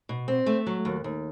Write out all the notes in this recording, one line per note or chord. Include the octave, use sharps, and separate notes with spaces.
B2
C4
A3
F#3
D#2
D#2